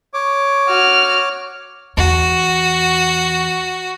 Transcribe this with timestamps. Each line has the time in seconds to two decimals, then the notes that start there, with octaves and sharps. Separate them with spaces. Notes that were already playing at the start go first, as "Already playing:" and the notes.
0.14 C#5 D6
0.68 F#4 F6
1.97 E2 F#4